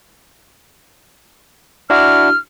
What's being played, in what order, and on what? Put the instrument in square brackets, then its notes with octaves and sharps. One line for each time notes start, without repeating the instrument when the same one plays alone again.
[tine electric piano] D4 E4 F#4 [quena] F6